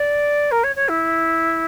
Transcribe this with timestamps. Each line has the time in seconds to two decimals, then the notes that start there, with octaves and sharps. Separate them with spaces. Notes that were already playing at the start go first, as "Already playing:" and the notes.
Already playing: D5
0.51 A#4
0.64 C#5
0.76 C#5
0.89 E4